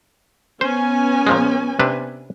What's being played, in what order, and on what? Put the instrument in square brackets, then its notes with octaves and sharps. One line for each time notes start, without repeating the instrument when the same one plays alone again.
[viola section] B3 C#4 G#5 [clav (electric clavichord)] C5
[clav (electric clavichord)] A#2 F3 G#3
C3 D4 B4